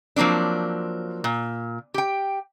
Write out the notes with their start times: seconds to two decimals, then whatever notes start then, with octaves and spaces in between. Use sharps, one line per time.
0.16 F3 F#3 A#3 C4 D4
1.24 A#2
1.94 G4 G5